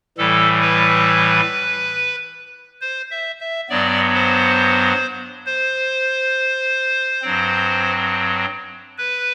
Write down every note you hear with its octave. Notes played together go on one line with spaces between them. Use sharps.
A2 E3 G3 A4
B4
C5
E5
E5
G2 F#3 B3 D5
C5
C5
G2 F#3 C4
B4